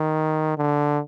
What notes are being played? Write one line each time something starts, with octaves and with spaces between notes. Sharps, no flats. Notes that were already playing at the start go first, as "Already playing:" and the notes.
Already playing: D#3
D3